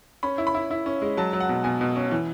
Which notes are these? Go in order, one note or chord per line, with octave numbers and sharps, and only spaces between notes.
C#4 B5
E4
B5
E4
E4
C#4
G#3
F#3 A5
F#3
F#5
B2
B2 G#5
B2
C#4
E3